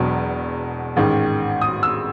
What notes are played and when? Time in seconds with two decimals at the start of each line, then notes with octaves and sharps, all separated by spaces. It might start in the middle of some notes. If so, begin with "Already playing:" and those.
Already playing: E1 E2 B2 F#3
0.96 A1 G#2 D#3
1.61 D#6
1.83 E6